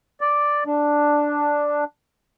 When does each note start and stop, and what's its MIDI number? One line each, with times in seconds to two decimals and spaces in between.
0.21 0.64 74
0.66 1.84 62